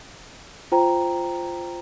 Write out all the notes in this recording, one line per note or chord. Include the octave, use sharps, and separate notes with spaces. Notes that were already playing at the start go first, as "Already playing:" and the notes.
F4 C5 G5 A#5